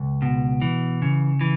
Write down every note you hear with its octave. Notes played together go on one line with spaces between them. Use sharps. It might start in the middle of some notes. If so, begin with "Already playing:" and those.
Already playing: C#2
B2
E3
C#3
E3